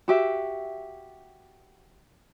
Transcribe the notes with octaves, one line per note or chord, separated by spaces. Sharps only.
F#4 G4 E5